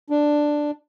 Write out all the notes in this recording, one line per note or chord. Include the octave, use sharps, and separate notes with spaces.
D4